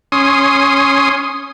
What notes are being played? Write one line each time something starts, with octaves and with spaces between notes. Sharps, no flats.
C#4 C6 D#6